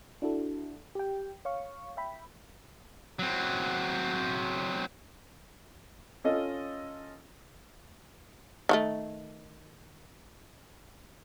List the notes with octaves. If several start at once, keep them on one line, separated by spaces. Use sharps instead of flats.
D4 E4 F#4 A4
G4 G5
C#5 F5 C#6
E5 G5 B5
F#3 C4
C#4 F4 A4 D#5
D#3 F3 A3